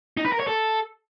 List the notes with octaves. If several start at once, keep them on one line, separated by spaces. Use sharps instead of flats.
D#4
B4
A#4
C#5
A4